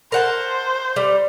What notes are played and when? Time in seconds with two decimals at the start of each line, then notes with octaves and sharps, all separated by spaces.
0.12 A#4 C5 F#5 A5
0.96 G3